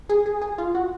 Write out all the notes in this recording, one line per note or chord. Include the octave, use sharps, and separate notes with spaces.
G#4
G#4
G#4
F4
F#4